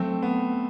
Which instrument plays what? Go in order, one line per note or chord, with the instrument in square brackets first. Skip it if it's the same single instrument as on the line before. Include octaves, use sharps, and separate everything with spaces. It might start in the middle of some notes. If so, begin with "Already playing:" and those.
Already playing: [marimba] F#3 [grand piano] A3 C4
[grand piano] B3